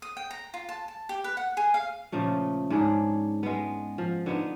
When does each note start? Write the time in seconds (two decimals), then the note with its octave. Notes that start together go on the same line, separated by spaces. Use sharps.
0.02 D#6
0.17 G5
0.31 A#5
0.54 F4
0.69 A5
0.88 A5
1.09 G4
1.24 B4
1.37 F#5
1.57 G#4
1.74 F5
2.12 A#2 C#3 F3 A3
2.70 G#2 C#4 D4 G#4
3.43 G#3 B3
3.98 F3
4.26 D3 B3 D#4